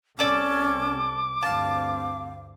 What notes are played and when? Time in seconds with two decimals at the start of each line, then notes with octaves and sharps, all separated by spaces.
0.19 C2 C3 C#4 A4 D5 D6 E6
1.43 D2 G2 C4 F5 A5